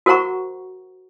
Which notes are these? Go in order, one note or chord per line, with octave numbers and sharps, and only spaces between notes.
F#4 A#4 C5 F#5 A#5 C#6